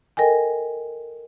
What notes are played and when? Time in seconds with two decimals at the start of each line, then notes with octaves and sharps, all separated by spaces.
0.17 A4 A#4 D#5 G5 G#5